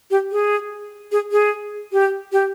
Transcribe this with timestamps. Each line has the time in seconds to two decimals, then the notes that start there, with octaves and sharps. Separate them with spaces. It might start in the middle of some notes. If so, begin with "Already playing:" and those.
0.11 G4
0.32 G#4
1.12 G#4
1.32 G#4
1.92 G4
2.32 G4